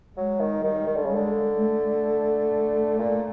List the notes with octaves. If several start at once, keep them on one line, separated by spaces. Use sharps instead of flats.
F#3 G#3
D#3
D#3 G3
D#3
D3
C#3
D3 G#3
A3
A#2